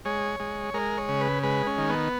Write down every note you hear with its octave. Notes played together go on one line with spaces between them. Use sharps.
G#3 C#5
G#3
G#3 A#4
C#5
C#3
B4
G#3 B4
C#4
D#3
B3